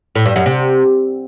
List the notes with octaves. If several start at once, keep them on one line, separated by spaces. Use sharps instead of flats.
A2
G2
F#2
C3